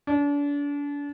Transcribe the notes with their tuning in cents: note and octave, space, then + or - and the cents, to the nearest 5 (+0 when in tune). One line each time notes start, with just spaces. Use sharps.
D4 -35